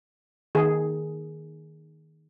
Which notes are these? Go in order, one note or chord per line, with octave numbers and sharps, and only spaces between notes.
D#3 G#4